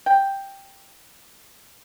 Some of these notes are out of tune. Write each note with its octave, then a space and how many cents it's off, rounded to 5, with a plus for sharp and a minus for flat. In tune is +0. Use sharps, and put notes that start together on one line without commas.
G5 +5